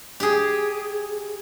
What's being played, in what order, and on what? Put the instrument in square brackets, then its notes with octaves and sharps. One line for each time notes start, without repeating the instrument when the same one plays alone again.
[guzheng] G4 G#4